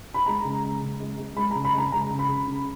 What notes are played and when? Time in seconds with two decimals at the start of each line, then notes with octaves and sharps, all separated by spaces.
0.14 B5
0.26 G#3 A#5
0.45 C#3
0.63 G#3
0.82 C#3
1.00 G#3
1.19 G#3
1.37 G#3 B5
1.51 A#5
1.55 C#3
1.65 B5
1.74 G#3 A#5
1.92 C#3 A#5
2.10 C#3
2.19 B5
2.29 C#3
2.47 C#3